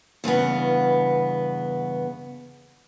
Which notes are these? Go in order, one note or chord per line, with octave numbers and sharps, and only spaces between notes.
E2 G2 C#3 B3